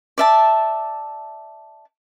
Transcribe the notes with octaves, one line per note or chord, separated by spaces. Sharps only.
D5 E5 A5